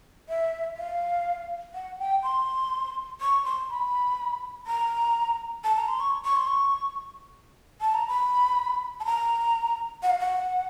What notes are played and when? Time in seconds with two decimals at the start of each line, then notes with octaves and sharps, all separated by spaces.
0.29 E5
0.77 F5
1.74 F#5
1.99 G5
2.23 C6
3.21 C#6
3.45 C6
3.70 B5
4.67 A#5
5.64 A5
5.76 A#5
5.88 C6
6.00 C#6
6.24 C#6
6.36 C6
6.47 C#6
7.81 A5
7.94 A#5
8.07 B5
9.00 A5
9.05 A#5
10.03 F#5
10.10 F5
10.19 F#5